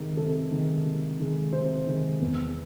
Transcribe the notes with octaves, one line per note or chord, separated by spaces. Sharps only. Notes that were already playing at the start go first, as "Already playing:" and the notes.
Already playing: C3 D#3 G#3
C3 A4
D#3 G#3
C3
D#3 G#3
C3 C5
D#3 G#3
E2